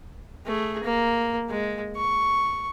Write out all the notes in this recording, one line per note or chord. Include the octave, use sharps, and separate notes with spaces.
A3 G#4
A#3
G#3
C#6